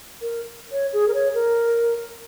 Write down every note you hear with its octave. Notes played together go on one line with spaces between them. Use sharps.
A#4
C#5
G#4
A#4
C#5
A#4